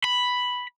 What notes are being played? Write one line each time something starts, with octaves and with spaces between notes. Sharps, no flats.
B5